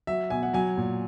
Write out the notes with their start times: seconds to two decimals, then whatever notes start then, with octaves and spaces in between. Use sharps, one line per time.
0.07 F#3 E5
0.30 B2 G#5
0.43 F#5
0.53 F#3 G#5
0.78 A#2